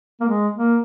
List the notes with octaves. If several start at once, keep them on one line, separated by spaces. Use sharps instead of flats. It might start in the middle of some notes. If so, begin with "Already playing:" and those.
A#3
G#3
A#3